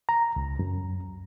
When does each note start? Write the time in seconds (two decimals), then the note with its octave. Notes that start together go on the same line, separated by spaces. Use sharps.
0.09 A#5
0.36 C#2
0.59 F#2